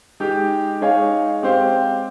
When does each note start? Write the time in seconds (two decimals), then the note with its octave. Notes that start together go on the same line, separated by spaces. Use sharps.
0.20 G#3 D#4 G4
0.81 G#3 D#4 G#4 C#5 F5
1.42 G#3 C4 G4 C5 F5